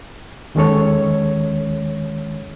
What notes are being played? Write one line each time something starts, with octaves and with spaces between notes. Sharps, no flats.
D#2 D#3 G#3 C#4 A4 C#5